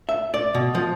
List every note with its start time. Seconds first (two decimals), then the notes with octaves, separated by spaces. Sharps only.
0.09 E5
0.34 D5
0.55 B2
0.75 F3